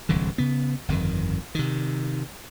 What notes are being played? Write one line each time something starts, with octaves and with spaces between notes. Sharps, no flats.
D1 C2 D3 E3
C#3 B3
G1 F2 D#3
C3 D#3